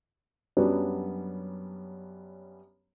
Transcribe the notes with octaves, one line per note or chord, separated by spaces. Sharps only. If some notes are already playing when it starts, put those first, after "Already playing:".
F#2 F#3 G3 B3 C#4 D4